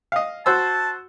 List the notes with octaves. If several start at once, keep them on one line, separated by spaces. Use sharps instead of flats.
D#5 F5
F#4 C5 A5 E6